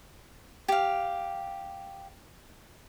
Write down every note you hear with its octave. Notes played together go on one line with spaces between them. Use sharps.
G4 F5